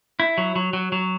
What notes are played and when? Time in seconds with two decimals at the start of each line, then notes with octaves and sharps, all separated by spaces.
0.20 E4
0.38 F#3
0.56 F#3
0.73 F#3
0.92 F#3